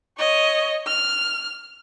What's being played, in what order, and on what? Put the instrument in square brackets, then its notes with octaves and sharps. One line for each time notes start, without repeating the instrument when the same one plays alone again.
[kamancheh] C#5 D#5
F6